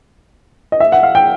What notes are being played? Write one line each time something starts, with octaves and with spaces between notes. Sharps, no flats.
D#5
E5
F#5
F5
G5